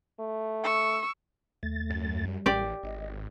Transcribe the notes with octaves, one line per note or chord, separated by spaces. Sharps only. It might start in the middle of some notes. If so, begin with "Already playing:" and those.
A3
C#6 E6
D#2 A3 A6
F#2
G3
A1 G4 D5
G#1 D#5